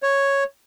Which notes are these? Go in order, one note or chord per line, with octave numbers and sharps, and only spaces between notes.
C#5